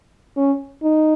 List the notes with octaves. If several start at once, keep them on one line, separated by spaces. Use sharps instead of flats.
C#4
D#4